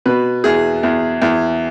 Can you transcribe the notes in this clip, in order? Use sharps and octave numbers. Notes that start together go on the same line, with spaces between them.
B2 B4
E2 G#4
E2
E2